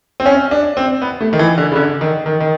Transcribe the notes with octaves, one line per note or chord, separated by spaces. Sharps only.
C4
C#4
D4
C4
B3
A3
D#3
E3
D3
C#3
D3
D#3
D#3
D#3